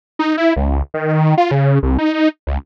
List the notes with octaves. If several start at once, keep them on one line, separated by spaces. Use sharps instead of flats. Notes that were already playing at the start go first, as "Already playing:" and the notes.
D#4
E4
C#2
D#3
F4
C#3
C2
D#4
C#2